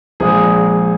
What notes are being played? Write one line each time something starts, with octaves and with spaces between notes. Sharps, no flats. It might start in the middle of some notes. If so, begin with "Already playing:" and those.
A#1 A#2 G#3 G#4